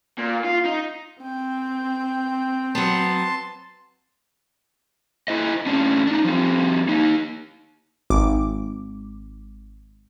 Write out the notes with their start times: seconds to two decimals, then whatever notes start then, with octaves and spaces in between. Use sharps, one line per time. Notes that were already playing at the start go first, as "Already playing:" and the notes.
0.18 A#2
0.44 F4
0.65 D#4
1.23 C4 G5
2.75 F#3 B3 A5 C6
5.28 E4 C5 D#5
5.66 A2 C#4 D4
6.07 D4 D#4
6.25 F3 G3 C4
6.88 A#3 D#4
8.10 G#1 D6